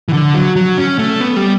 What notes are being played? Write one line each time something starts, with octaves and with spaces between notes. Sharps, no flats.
E3
D3
F#3
F#3
C#4
A3
B3
G3